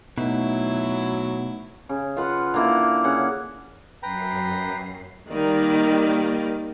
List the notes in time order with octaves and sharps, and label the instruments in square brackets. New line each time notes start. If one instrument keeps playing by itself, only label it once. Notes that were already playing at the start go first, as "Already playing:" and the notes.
[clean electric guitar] B2 [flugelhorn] F#3 [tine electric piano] A3 B3 D#4 [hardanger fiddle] E4
[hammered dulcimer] C#3
F4 B4 F#5
D3 A#3 E4
C#3 F#5
[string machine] F#2 C7 [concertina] B4 G5 A#5
[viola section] D#3 G3 A#3 D5